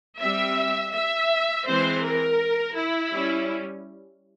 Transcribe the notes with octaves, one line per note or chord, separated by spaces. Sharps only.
G3 C4 E5
E5
E3 G#3 C4 C5
A#4
E4
G3 C#4